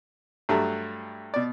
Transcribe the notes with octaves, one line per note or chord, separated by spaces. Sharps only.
G2 F#3 A3
B2 D5